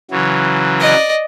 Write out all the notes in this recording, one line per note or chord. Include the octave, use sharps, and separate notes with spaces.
C#3 E3 F#3
D5 D#5